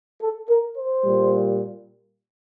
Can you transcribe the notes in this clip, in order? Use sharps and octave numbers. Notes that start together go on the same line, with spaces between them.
A4
A#4
C5
A#2 G3